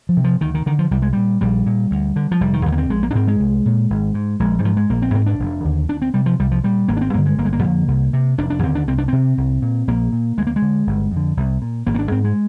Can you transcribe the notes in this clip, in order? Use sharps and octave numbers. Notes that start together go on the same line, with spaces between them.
F3
C3
F3
D2 D#3
D#3
D3 D#3
F3
C2 G3
G#3
A#2 G3
A#1 G3
A#2
D2
D3
F3
F1 G3
D#3
D#2 D3 F3
A#3
C4
A#1 G#3
A#3
D4
G#2 C4
G#3
C2
A#2
G#1
G#2
A#1 G#3
G3
G#2 F3
G#3
A#1 A#3
C4
G#2 C4
D4
F1
D#2 D3
D2 D4
C4
C3 G3
F3
C2 G3
F3
A#2 G3
G#1 A#3
D4
C4
G2 D3 A#3
G#3
G1 A#3
G#3
A#3
F2 D3
C2
C3
F1 D4
D4
D#2 D3 C4
D4
C2 C4
D4
C3 C4
C2
A#2
A#1 A#3
A#2
D2 G#3
A#3
G#3
D3
G1
F2 D3
C2
A#2
G#1 A#3
C4
D4
G#2 C4
G#3